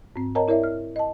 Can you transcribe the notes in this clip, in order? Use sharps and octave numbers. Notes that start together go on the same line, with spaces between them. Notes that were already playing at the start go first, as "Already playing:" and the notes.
G#2 C4
A#4 C#5 D#5 G5 A5 A#5
E4 A#4 C#5 D5 E5
F6
D#5 A5